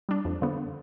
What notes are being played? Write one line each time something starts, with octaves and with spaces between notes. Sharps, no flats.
G3 D4
F2
D3 F3 B3